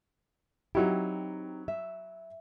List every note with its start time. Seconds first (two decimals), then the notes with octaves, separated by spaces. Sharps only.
0.75 F#3 C4 D#4 E4 G4
1.68 E5